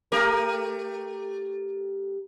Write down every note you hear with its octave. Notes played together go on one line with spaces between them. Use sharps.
A3 G4 A#4